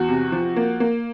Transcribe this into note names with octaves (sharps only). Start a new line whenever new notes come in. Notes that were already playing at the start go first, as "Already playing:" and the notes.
Already playing: E2 F#4
C3
F3
A#3
A#3